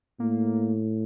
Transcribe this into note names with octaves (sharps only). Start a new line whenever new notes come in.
A2 A#3